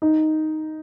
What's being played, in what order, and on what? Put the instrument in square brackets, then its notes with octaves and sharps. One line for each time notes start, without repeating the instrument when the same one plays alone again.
[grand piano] D#4